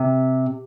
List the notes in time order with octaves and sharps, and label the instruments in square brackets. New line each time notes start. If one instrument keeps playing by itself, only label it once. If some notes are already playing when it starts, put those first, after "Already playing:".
Already playing: [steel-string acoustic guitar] C3